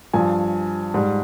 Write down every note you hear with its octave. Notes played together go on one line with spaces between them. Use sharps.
G2 F3 G#5
G#2 G3